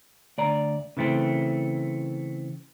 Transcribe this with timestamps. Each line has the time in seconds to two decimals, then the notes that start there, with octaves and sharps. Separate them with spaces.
0.38 D2 D5 A#5
0.97 C#3 E3 A3 C4